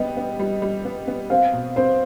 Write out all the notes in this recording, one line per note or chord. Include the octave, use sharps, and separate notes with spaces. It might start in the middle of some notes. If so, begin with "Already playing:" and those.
Already playing: G3 B3 D#5 G5
B3
G3
G3
B3
B3
C4 F5
B2
C4 C5